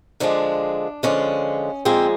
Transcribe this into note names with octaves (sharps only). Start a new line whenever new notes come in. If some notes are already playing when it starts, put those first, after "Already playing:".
D3 F3 G#3 D4
D3 F3 G#3 C#4
A#2 F3 G#3 C4